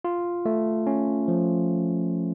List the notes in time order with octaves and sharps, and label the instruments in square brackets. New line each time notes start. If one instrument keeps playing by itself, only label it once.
[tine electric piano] F4
A3
C#4
F3